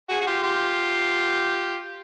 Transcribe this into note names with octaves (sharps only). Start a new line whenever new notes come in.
F#4 G#4
F#4
F4 G4
F4 G4